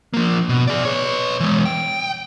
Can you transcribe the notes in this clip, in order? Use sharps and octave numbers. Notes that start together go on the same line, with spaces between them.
F3 A#3
B2
G#4 D5
B4 C#5
E3 G#3
G5